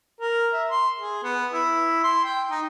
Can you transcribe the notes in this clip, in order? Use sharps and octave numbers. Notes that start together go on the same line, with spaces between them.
A#4
E5
C6
G#4
B3
E4
C6
G5
D#4